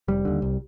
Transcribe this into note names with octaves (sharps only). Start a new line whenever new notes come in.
F1 G3
D#2 D3
C2